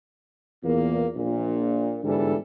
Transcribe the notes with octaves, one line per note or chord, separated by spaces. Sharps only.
E2 A#2 A#3
A#1 A#2
G1 G#2 D3 E3 G3 A4